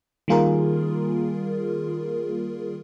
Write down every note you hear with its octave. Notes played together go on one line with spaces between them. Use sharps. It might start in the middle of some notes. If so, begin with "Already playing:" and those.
D#3 G3 A#3 F4 G#4 A#4